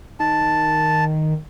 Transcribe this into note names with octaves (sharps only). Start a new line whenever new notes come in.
D#3 A5